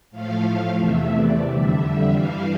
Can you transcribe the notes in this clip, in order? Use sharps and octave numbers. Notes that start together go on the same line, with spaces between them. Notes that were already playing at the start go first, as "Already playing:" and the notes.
A2 F3 A3 F5
F5
E2 C3 E3 A3 E5
D5
F2 D3 G3 E5
G2 E3 G3 F5